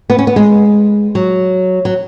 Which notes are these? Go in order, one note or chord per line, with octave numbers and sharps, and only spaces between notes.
B3
C#4
B3
G#3
F#3
F#3